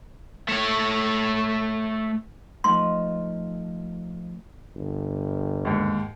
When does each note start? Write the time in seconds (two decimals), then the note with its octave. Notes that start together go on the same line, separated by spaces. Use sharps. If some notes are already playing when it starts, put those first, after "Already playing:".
0.48 A3 C#5
2.64 F3 A3 D#4 C6
4.75 G1
5.65 D#2 G#2